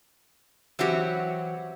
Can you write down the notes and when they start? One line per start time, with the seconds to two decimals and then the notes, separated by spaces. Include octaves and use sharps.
0.79 E3 F#3 C4 F#4 G4